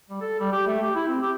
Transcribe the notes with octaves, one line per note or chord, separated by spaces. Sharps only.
G3
A4
G3
G4
A3
G4
E4
C4
G4